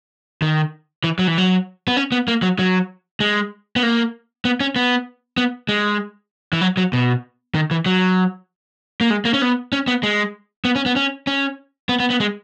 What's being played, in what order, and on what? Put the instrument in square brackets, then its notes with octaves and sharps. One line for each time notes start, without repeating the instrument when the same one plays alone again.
[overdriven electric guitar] D#3
E3
F#3
E3
F#3
B3
C#4
B3
A#3
F#3
F#3
G#3
B3
A#3
B3
C#4
B3
B3
G#3
E3
F#3
F#3
B2
D#3
E3
F#3
A#3
G#3
A#3
C#4
B3
C#4
B3
G#3
B3
C#4
B3
C#4
C#4
B3
B3
B3
G#3